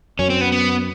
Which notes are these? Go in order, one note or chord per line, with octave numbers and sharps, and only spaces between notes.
F#2 C#4
C4
B3
B3